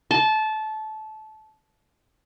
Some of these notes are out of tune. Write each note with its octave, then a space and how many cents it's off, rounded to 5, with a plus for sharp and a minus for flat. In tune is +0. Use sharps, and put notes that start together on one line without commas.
A5 -20